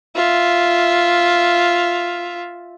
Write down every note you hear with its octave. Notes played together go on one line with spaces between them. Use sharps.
F4 E5